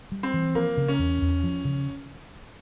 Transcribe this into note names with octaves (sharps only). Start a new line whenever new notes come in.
G3
C4
E3
F3 A#3
C#3
C#4
E2
E2
F3
C#3